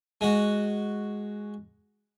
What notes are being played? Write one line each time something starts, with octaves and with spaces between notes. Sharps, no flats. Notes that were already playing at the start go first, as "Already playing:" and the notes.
G#3 F#4